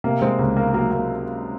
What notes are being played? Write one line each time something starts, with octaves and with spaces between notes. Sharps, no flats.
C3 A#3
G#3 C4
C#2 A#3
A#3
F#3 A#3
A#3